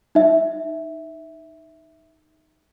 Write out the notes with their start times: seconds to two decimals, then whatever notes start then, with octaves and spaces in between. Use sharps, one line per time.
0.15 D#4 E5